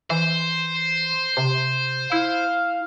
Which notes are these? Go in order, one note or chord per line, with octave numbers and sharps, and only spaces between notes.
E3 C5
C3
E4 F5